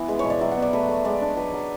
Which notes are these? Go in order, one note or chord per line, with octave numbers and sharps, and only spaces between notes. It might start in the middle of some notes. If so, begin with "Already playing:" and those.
Already playing: E3 B3
G#3 B4
C#5
B2
D5
F#3 E5
F#5
B3
D5
A3 B4
A3
G#3 D5
D4
F#3 B4
F#3